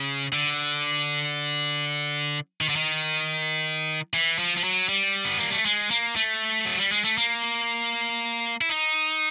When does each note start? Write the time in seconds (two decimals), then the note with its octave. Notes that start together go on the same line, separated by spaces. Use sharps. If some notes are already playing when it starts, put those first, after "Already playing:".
Already playing: C#3
0.33 D3
2.61 D#3
2.69 D3
2.76 D#3
4.14 E3
4.39 F3
4.57 F3
4.64 F#3
4.89 G3
5.25 B3
5.38 A#3
5.52 A3
5.65 G#3
5.91 A#3
6.16 A3
6.65 F#3
6.78 G3
6.92 G#3
7.04 A3
7.18 A#3
8.61 E4
8.70 D#4